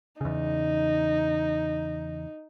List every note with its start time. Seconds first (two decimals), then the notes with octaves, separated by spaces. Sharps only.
0.21 E2 C#3 D#4